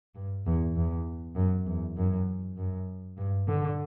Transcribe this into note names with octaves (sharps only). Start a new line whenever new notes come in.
G2
E2
E2
F#2
E2
F#2
F#2
G2
D3